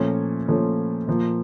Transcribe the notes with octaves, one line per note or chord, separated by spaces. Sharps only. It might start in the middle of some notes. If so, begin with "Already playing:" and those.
Already playing: A#2 F3 A3 C#4
A#2 F3 A3 C#4
A#2 F3 A#3